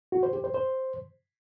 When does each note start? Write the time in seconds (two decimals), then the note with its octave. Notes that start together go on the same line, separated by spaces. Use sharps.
0.12 F#4
0.23 C5
0.33 G4
0.44 C5
0.54 C5